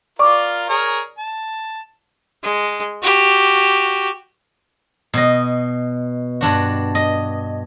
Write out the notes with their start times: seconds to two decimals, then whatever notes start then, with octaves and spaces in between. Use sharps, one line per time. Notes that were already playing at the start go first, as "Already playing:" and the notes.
0.19 F4 A#4 D5 C#6 D6
0.69 G#4 A#4 C#5
1.18 A5
2.43 G#3
3.02 F#4 G4
5.14 B2 D#5
6.41 G2 D4 F#4
6.95 D#5